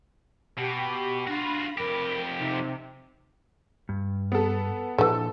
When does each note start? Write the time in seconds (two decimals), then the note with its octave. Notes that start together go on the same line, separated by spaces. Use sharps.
0.58 B2 G4
1.27 D4 F4 F#4 B5 A#6
1.77 F2 G4 A#4
2.39 C3 D#4
3.89 G2
4.32 B3 A4
4.98 A#2 D3 E3 F3 D4 A4